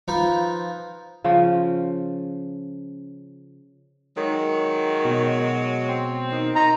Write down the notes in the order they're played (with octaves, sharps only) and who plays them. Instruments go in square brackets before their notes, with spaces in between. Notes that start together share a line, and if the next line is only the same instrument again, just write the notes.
[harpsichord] F3 D#4 F4 B4
[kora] C#3 F3 C#4
[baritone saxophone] D#3 [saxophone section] F#3 G#3 C#5
[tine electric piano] B2
[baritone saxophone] C4
[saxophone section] D#3
[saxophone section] D#4 [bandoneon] A#5